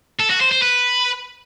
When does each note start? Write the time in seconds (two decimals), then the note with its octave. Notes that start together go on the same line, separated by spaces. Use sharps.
0.19 A4
0.30 F#4
0.41 C5
0.51 C5
0.62 B4